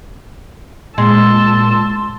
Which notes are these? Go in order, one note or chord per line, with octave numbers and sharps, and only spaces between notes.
A#2 G#3 A5 C6 E6